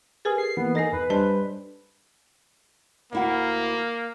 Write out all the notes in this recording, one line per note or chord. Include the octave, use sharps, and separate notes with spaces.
G4 G#4 A#4 B4
C7
E3 A#3 B3
D#4 A4 A#4 G#5 A#6 C7
E2 B4
G3 D4 C5 D#5 A5
D2 A#3 E4 F#5